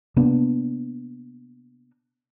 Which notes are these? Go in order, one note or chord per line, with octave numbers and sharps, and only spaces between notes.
C3 A#3 B3 D4